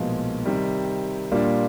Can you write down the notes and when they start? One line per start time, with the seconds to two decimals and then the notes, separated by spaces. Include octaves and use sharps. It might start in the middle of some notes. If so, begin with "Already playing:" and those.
Already playing: B1 A#2 F3 G#3 B3
0.45 C3 D#3 G3
1.32 A#2 G3 A#3 D4 F4